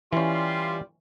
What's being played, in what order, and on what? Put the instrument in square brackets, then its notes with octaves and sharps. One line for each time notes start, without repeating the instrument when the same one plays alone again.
[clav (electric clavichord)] E3 C#4 [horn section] G3 F4 C6